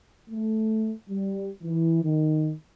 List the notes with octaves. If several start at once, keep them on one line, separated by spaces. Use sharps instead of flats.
A3
G3
E3
D#3